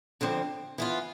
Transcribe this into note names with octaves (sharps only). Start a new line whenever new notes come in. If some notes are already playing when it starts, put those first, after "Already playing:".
F2 D3 F3 C4
E3 B3 F4